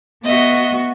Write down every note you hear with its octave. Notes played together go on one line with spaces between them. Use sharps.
B3 F#4 D#5 E5